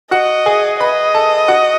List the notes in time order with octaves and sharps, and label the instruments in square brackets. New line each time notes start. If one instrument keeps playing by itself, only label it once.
[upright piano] F#4 F#5 [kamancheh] D#5
[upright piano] G#4 G#5
[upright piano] B4 B5 [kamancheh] D#5
[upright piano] A4 A5
F#4 F#5